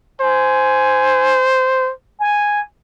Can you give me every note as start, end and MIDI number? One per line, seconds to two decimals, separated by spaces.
0.21 1.91 72
0.21 1.50 80
2.20 2.61 80